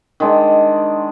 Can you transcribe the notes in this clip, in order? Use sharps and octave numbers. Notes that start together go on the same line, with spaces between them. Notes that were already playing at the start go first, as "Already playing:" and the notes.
D#3 G#3 D4